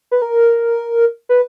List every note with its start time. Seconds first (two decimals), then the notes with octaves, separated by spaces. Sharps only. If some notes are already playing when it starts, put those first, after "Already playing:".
0.11 B4
0.22 A#4
1.29 B4